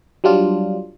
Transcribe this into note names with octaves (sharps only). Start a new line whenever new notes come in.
F#3 G3 D4 F4